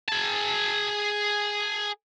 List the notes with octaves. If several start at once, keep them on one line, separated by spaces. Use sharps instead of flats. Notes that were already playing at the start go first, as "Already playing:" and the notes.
G#4 A5